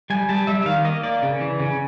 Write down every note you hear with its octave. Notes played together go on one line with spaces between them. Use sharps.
G3 G#5
G3 A5
G3 E5
D#3 F5
A#3 D#5
A#3 D5
C#3
E3
C#3